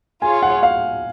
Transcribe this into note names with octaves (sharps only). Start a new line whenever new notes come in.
F4 G#4 C#5 G#5
F#5
F5